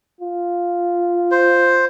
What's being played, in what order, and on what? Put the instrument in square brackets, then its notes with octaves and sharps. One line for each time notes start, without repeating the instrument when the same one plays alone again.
[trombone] F4
[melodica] C5